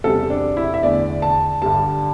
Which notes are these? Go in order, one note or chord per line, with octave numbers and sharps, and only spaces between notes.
E2 C3 G3 A4
D4
E4
E5
E2 D3 A3 D5
A5
G2 D3 G3 A5